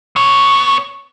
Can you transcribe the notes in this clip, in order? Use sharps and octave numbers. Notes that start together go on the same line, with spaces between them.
B3 C#5